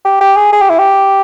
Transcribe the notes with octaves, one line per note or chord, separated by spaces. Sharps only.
G4
G4
G#4
G#4
G4
E4
G4